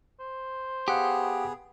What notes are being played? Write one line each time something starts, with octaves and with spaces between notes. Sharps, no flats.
C5
B3 G4 G#4 F5 F#5 D#6